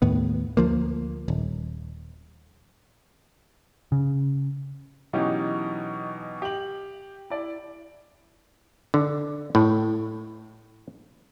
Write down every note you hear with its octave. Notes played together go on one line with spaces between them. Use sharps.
D#2 A2 B3
D2 F3 A#3
D#1
C#3
B2 E3 F#3 C#4 D#4 G4
G4 F#7
E4 D5
D3
A2